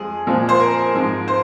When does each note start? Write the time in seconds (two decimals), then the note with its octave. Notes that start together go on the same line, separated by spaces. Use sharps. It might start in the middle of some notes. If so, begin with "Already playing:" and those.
Already playing: F2 F3 G#3 G#4
0.27 A#2 F3 G#3
0.49 C5
0.60 A#4
0.94 G#2 F3 G#3
1.28 C5